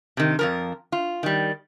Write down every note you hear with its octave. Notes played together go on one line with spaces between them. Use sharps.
C3 D#3
F2 F3 A#4
F4
D#3 G3